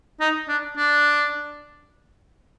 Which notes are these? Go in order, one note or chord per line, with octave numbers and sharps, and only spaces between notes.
D#4
D4
D4